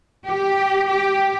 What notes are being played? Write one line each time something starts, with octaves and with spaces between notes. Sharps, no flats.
G4
G4